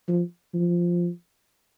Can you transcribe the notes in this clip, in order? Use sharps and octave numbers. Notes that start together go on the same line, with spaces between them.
F3
F3